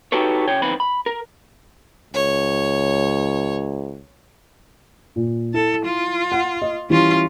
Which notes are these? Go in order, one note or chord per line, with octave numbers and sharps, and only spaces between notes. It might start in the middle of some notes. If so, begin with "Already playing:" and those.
D#4 F#4 G4 A4 B4 C#5
C#3 C#5 G5
B1 F2 D#3 C4 B4 B5
B5
A#4
C#2 C#5
A#2
E4 A4
F4
F#5
D#5
E3 G3 C#4 E4 F4